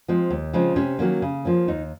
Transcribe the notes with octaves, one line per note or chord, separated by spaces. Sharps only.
F3 G#3 C4
D#2
C#3 F3 G#3 C4
C3 C#4
D#3 F#3 A#3 C#4
C#3
F3 A#3 C#4
D#2 D#4